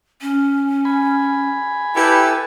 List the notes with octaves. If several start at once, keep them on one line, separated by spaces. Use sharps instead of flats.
C#4
G#5 B5
E4 G4 A4 B4